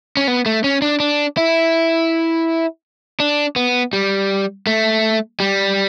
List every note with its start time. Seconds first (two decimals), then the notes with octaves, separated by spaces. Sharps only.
0.17 C#4
0.28 B3
0.46 A3
0.64 C#4
0.82 D4
1.00 D4
1.37 E4
3.20 D4
3.56 B3
3.93 G3
4.67 A3
5.40 G3